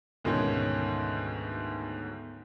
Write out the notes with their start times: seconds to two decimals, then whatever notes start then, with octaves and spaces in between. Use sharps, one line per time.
0.24 D2 G#2 B2 D#3 C#4